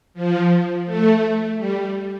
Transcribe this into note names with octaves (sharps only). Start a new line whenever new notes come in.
F3
A3
G3